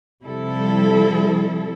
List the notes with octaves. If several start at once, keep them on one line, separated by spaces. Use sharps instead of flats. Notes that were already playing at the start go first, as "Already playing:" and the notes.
C3 F3 G3 E4 A4